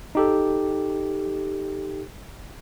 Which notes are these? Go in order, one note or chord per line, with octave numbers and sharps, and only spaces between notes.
D#4 G4 A4